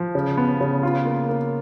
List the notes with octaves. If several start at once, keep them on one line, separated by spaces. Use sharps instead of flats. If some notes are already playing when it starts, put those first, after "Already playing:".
Already playing: F3
C#3
B3
C#3
F4
A#3
A#3